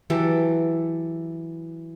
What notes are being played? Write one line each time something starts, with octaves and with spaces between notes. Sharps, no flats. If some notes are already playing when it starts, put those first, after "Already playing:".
E3 F#3 G4 A4